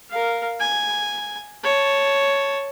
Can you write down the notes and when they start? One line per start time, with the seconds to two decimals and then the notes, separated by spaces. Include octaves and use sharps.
0.10 A#4 F5
0.61 G#5
1.64 C#5 A5